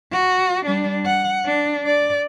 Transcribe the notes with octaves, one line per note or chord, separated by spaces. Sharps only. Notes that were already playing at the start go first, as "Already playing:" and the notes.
F#4
G3 D4
F#5
D4
D5